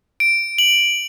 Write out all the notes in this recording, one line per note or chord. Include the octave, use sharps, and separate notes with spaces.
D7
F#7